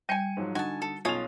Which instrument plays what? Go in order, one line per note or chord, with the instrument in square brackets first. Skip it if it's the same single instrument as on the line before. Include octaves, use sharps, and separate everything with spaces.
[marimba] G3 [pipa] G5 G#5 [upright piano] C#7 D#7
[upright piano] G#2 F3 F#3
[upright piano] D3 D#4 [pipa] F#4 [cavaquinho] G#5 A5
[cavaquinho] A4
[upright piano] B1 F7 [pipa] C#4 C#5 [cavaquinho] F4 D#6